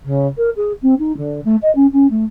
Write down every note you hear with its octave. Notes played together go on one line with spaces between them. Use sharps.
C#3
A#4
G#4
C4
D#4
D3
A3
D#5
C#4
C#4
A3